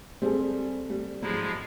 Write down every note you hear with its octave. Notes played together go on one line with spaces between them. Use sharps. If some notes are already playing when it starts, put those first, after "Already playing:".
G3 G#3 C4 G#4 A4
G3
G#2 F3 F#3 G#3 E4